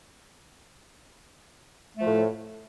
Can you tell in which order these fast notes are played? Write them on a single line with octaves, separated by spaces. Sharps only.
A3 F3 A2